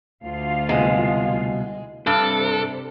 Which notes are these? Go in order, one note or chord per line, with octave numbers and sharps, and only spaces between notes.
D2 F4 F5
C2 F#2 B2 G#3
G2 C3 D4 A4